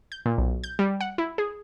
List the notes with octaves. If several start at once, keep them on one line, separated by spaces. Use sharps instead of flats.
G6
A#2
B1
G6
G3
F#5
E4
G#4